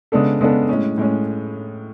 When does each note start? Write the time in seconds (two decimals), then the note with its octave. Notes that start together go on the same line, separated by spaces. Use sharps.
0.12 C#3 G#3 B3 D4 A4
0.41 C#3 G#3 B3 D4 A4
0.69 A2 G#3 C#4
0.98 A2 G#3 C#4